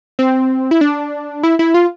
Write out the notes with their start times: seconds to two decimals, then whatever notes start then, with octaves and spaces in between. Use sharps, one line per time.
0.19 C4
0.71 E4
0.81 D4
1.43 E4
1.59 E4
1.74 F4